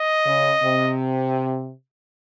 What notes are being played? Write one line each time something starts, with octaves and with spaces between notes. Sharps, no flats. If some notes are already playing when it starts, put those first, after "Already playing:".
Already playing: D#5
C#3
C3